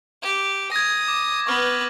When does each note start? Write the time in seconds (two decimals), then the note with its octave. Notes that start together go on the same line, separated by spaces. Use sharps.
0.22 G4
0.72 D#6 G#6 A#6
1.08 D6
1.47 B3 B4 C#6 F6